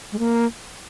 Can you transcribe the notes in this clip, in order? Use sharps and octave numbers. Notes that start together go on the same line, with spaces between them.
G#3
A#3